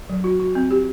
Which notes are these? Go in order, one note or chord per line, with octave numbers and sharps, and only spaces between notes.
F#3
F#4
F#4
C4
G4